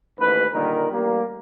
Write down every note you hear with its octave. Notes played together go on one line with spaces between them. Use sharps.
A1 D#2 G#2 B4
A#2 D3 D#3 G3 A#4
A1 G3 A#3